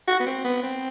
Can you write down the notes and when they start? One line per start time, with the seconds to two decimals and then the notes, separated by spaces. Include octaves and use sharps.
0.08 F#4
0.20 B3
0.26 C4
0.44 B3
0.63 C4